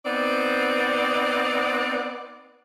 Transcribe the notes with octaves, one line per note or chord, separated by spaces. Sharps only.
B3 C4 D#4 D5